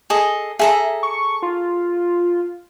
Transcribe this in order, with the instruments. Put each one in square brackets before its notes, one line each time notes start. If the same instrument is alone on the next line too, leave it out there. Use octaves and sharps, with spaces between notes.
[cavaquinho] G#4 A4 D#5
[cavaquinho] G#4 A4 A#5 [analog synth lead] E5
[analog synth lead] C#6
F4